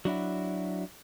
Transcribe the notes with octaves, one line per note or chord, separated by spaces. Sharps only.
F#3 D4 E4 F#4